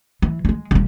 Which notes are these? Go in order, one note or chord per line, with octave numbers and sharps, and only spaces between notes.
E3
F#3 G#3
E1 G3